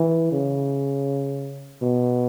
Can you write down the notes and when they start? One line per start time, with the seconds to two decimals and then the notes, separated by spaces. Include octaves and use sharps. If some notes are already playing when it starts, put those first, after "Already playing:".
Already playing: E3
0.32 C#3
1.82 B2